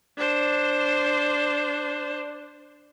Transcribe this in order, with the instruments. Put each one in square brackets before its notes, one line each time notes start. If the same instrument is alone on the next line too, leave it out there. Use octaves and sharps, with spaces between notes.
[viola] D4 C5